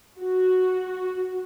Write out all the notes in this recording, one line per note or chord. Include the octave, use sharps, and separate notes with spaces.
F#4